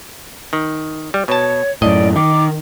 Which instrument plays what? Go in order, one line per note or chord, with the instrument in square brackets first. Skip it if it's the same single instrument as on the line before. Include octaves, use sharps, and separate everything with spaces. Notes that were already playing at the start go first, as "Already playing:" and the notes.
[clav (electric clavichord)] D#3
G3
[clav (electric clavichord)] B2 A5 [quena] C#5
[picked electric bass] F#2 A2 [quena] D5 [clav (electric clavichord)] D#5
[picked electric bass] D#3 [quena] D6